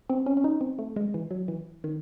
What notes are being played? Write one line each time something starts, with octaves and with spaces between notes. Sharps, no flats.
C4
C#4
C#4
D#4
C4
A3
G#3
E3
F#3
E3
D#3